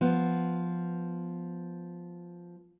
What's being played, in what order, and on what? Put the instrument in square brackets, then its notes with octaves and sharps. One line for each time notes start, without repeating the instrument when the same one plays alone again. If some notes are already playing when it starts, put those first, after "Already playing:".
[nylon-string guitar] F3 B3